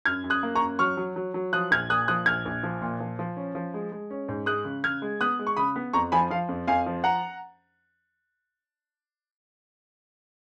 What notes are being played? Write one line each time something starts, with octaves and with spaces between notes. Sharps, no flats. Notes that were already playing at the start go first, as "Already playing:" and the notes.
F#2 F6 G#6
F#2
D#6 F#6
A#3
A#5 C#6
F#2
F#3 C#6 F6
F#3
F#3
F#3
F3 D#6 F#6
A#1 F6 G#6
A#2 D#6 F#6
F3 D#6 F#6
A#1 F6 G#6
A#1
F3
A#2
F3
F3
C#4
F3
G#3
G#3
C#4
G#2
G#3 D#6 F#6
C#3
C#3 F6 G#6
G#3
B3 D#6 F#6
G#3
C#6
C#3 B5 D#6
B3
F2 A#5 C#6
F3 G#5 B5
F3 F5
F2
F2 F5 G#5
F3
F#5 A#5